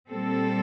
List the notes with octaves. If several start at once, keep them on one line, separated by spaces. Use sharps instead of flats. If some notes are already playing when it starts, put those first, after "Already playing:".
A#2 G3 C4 A4